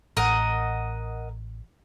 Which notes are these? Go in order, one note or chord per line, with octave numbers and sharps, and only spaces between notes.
A1 A#4 D#5 F#5